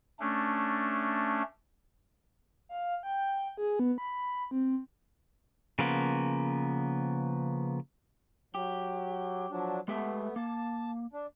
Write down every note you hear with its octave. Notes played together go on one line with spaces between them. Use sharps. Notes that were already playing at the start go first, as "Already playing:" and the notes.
A3 C#4 D4
F5
G5
G#4
B3
B5
C4
C#3 F3 A#3 B3
F#3 G4
F3 F#3 D4
G#3 A3 B3 G4 E5
A#3 A5
D4